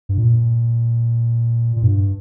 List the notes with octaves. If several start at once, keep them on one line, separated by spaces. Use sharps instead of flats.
G2
A#2
A#2
G2